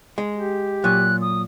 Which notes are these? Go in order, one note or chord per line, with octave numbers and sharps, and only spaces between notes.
G#3
G4
A#2 F#3 G#5 F#6
D#6